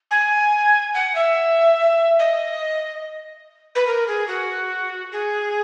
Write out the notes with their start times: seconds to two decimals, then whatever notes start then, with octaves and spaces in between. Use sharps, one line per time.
0.10 G#5
0.94 F#5
1.15 E5
2.19 D#5
3.75 B4
3.86 A#4
4.07 G#4
4.27 F#4
5.12 G#4